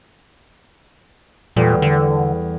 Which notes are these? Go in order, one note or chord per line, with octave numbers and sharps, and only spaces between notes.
E2 A#2 G3 A3
D3